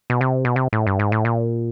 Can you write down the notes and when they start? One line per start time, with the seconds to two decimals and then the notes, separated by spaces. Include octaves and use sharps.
0.10 B2
0.21 C3
0.45 B2
0.56 C3
0.73 A2
0.87 G2
0.99 G#2
1.12 A2
1.25 A#2